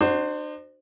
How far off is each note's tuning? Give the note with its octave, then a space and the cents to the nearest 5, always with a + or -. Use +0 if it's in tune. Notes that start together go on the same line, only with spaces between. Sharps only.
D4 +45 F#4 +15 C5 +0